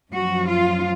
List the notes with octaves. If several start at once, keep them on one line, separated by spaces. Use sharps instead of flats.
F#2 F3 F#4
F4